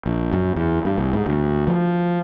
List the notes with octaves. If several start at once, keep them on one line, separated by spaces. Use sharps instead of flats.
A#1
F#2
E2
G2
C2
G#2
D2
F3